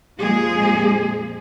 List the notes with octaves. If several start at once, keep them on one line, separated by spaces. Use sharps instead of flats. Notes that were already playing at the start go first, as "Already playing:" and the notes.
F2 A#2 F3 G#3 G#4